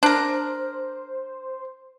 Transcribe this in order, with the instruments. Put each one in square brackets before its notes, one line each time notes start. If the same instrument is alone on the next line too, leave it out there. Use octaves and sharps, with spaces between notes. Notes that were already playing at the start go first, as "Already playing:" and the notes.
[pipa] D4 A#4 [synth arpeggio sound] C5